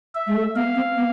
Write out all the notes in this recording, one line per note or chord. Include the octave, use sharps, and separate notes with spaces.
E5
G#3
A3
B3 F5
C4
B3